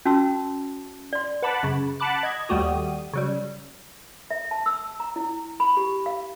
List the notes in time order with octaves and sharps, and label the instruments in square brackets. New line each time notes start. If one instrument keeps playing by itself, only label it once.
[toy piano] C#4 F#4 A5 C6 E6
D5 C6
[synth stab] B4 F#5 A5 B5 D6
F#2 C#3
F#5 A5 B5 D6 F#6
D#5 G#6
D#2 G3 A3 F#4 G4 D#6
C#3 F#3 G3
[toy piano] E5
A5
E6
A#5
E4
B5
G4
F5